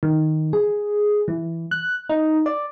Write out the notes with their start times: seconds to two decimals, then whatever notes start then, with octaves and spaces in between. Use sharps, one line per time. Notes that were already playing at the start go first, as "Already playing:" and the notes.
0.03 D#3
0.53 G#4
1.28 E3
1.71 F#6
2.09 D#4
2.46 D5